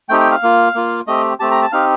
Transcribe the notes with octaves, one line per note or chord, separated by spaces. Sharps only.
A3 C4 D#4 G4 G5
G5
F5
A#3 F4
A#3 F4
A3 C4 G4 D#5
A3 C4 G4 A5
A#5
A5
C4 D#4 G4 F5